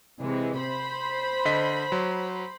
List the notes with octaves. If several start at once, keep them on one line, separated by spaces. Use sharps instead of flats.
C3 E3 G#3
C5 B5
D3 D#5 B6
F#3